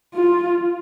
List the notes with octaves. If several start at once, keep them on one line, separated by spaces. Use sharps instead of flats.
F4